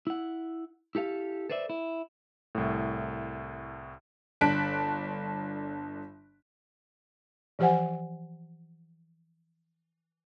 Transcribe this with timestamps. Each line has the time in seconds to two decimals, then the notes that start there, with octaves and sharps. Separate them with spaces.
0.07 E4 F#5
0.95 E4 G4 A4 F5
1.50 A4 B4 C5 D5 E5
1.70 E4
2.55 C2 A2
4.41 G1 D4 A5 F#6 B6 D7
7.59 E3 F3 G4 C5 F#5 G#5